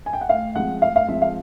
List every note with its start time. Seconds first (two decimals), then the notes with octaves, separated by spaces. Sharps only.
0.06 G#5
0.13 G5
0.21 F#5
0.29 A2 F5
0.55 F3 G#3 C4 F#5
0.82 A2 F5
0.96 F5
1.08 F3 G#3 C4 E5
1.22 F5